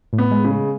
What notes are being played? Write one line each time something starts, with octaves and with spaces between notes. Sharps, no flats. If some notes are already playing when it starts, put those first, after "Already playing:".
A2
B3
G#3
C#3
G#3